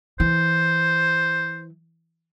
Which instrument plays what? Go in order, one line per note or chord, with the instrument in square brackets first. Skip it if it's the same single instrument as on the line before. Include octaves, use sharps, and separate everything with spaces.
[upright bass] E3 [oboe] C5